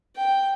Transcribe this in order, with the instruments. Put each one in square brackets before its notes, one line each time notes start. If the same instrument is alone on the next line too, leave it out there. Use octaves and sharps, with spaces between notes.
[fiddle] G5